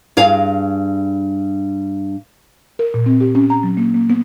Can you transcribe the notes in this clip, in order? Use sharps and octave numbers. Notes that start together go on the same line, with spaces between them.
G2 G#4 F5
A#4
A#2
C4
G4
C#4
A#5
F#3
A#3
A#3
B3